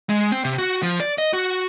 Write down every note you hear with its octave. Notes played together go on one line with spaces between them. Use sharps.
G#3
C4
C3
F#4
F3
D5
D#5
F#4